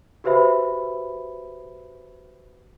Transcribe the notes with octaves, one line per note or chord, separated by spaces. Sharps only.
F#4 G4 B4 C5 E5 B5